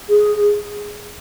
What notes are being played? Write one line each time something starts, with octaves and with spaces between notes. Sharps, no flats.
G#4